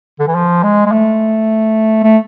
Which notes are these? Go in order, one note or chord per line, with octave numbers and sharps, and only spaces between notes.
D3
E3
F3
G#3
G#3
A3
A3